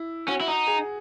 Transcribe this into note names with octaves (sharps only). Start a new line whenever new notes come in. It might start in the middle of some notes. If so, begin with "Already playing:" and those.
Already playing: E4
C#4 F#4
E4
D#4
G#4